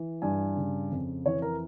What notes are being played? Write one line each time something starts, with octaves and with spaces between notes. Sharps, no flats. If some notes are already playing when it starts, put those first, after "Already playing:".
Already playing: E3
G2 G#5
C#3
F2
E3 C#5
A#4